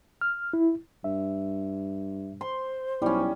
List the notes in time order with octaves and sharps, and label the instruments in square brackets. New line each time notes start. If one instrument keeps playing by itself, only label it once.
[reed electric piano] F6
E4
[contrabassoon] G2 [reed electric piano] E5
[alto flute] C5 [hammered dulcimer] C6
[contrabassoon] B1 [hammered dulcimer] G3 C#4 [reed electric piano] E4